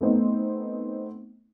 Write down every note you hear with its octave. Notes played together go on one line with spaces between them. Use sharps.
A3 B3 C4 D#4